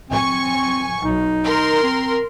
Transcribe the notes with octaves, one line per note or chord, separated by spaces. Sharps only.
C4 G#5 C#6
B1 D#4
A#4 C6
C4